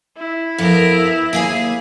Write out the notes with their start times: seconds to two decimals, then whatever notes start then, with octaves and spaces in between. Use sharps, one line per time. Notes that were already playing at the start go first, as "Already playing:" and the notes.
0.17 E4
0.58 F2 B3 A#4
1.33 D#2 A#3 G#4 G#5